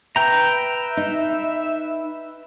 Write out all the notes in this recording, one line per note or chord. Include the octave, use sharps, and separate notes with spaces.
B4 E5 G5 A#5
D#4